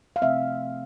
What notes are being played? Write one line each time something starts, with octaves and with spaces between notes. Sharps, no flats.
F5
C3 F3 A3 C4 E5